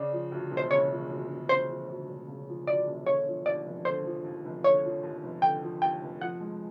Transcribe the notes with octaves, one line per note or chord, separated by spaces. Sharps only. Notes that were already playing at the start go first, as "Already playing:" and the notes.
Already playing: C#3 D5
F3
D2
E1
C5
C#3 C#5
F3
D2
E1
C#3 C5
F3
D2
E1
C#3
F3
D2 D5
E1
D3 C#5
F3
D#2 D5
F1
D3 C5
F3
D#2
F1
D3 C#5
F3
D#2
F1
D3 G5
F3
D#2 G5
F1
F3 F#5
G#3